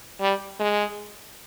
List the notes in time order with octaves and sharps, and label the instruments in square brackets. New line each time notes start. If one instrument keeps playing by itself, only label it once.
[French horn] G3
G#3